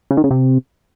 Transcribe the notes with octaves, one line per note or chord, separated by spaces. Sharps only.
C#3
D#3
C#3
C3